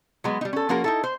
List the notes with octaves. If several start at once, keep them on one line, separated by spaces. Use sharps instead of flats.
F#3 G#3 B3
G3 D#4
C#4 A4
F3 A#3 C#4 F#4 G#4 A#4
D#4 E4 A4
C5